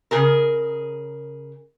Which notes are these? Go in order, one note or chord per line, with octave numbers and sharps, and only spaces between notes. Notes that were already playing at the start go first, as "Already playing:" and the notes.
C#3 G#4 A#4